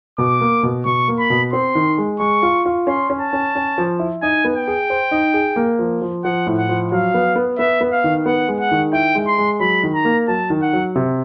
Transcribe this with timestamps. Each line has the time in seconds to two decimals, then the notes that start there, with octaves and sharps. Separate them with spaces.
0.18 B2 D6
0.41 A#3
0.63 B2
0.85 B2 C#6
1.08 A#3
1.19 B5
1.30 B2
1.53 C4 C6
1.75 D#3
1.98 G#3
2.20 G#3 C#6
2.43 F4
2.66 F4
2.87 C#4 C6
3.10 C#4
3.21 A5
3.33 C#4
3.55 C#4
3.78 F3
3.99 E4
4.22 D#4 G#5
4.45 B3
4.56 G5
4.68 G#4
4.90 C5
5.11 D#4
5.34 G#4
5.56 A#3
5.79 F3
6.02 F3
6.24 F3 F#5
6.47 A2
6.58 F#5
6.69 F3
6.92 F#3 F5
7.14 B3
7.36 B3
7.58 B3 E5
7.81 B3
7.92 F5
8.04 D#3
8.26 B3 F#5
8.48 G#3
8.60 F#5
8.71 D#3
8.93 E4 G5
9.15 G#3
9.27 C6
9.38 G#3
9.60 F#3 B5
9.83 D#3
9.94 A#5
10.05 A#3
10.28 F#3 A5
10.50 D#3
10.62 F#5
10.73 F#3
10.96 C3